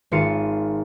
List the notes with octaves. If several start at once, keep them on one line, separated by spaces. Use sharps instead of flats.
G#1 F4 C#7 D#7